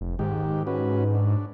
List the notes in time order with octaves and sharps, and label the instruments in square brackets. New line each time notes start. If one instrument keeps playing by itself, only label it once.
[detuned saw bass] F1
[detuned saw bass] G#2 [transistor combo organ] D#3 G4
[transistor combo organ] C#4 F#4 B4
D4